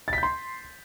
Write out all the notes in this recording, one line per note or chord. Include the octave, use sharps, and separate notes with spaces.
A6
B6
G6
C6